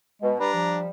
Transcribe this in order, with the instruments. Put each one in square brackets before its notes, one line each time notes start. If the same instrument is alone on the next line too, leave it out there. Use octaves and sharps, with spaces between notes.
[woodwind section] B2 [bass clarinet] G#3
[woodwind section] G3 [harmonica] D4 A#5 [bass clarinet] B4
[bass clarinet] F3